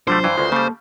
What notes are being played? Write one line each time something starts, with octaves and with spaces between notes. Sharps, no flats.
D3 F#3 G3 A3 D4 F4 C5
G2 E3
D2 C#3 G#3 F4 B4
C#3 G3 A#3 A4 A5